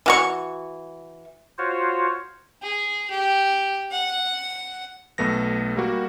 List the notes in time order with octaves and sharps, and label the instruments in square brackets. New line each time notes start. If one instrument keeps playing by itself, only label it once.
[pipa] E3 F#4 C#6
[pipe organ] F4 F#4 C5 C#5
[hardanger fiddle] G#4
G4
F#5
[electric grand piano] B1 A3 B3 A#6
G3 A#3 F#4